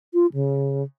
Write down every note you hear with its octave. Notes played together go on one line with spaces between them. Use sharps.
F4
C#3